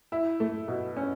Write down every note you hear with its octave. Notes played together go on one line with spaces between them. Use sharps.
E4
A3
B2
C#4